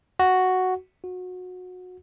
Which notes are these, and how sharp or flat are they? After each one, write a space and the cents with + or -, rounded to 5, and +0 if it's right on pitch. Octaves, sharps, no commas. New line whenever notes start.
F#4 +0
F#4 -25